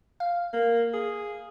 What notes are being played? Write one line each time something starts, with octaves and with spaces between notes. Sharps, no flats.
F5
A#3
G#4